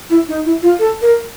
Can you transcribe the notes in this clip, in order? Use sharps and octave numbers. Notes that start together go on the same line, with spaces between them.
E4
D#4
E4
F4
A4
A#4